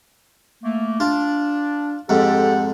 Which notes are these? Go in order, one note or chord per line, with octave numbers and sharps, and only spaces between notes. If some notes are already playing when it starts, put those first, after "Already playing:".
A3 A#3
D4 F4
F2 G#2 G4 A4 F#5